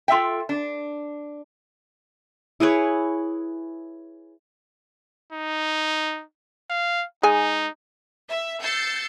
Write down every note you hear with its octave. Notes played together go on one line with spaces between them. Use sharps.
F4 A4 E5 G5
D4
E4 G#4 B4 C#5
D#4
F5
G#3 D#4 G#5
E5
E6 G6 A6 C7 C#7